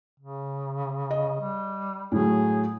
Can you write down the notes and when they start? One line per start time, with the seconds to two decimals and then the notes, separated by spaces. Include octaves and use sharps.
0.20 C#3
1.11 D#5
1.40 G3
2.12 A2 F#3 G#4